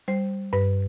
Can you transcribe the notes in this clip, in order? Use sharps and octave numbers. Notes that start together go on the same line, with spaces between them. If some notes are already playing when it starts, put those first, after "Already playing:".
G3 C5
G2 B4